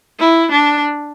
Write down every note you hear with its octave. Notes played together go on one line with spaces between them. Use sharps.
E4
D4